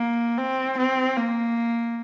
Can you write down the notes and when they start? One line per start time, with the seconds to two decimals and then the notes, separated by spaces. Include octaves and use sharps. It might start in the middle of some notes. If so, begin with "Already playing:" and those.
Already playing: A#3
0.38 C4
0.78 C4
1.17 A#3